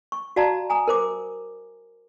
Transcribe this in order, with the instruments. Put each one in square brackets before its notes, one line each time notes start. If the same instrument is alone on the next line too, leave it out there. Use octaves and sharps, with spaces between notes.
[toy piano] C#6
F#4 D5 F5 A5 A#5
G#5 A#5 D#6
A#4 C5 D6